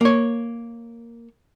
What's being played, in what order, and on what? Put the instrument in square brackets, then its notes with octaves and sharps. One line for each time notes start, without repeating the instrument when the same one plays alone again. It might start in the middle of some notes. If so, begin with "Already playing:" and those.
[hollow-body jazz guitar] A#3 C#5